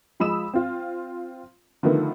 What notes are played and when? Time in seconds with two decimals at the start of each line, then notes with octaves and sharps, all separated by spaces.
0.20 F3 G#3 B5 D#6 E6 E7
0.54 C4 F4
1.83 D3 D#3 F3 A3 B3